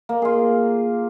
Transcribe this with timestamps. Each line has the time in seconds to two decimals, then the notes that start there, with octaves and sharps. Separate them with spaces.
0.09 A#3
0.22 F4 G#4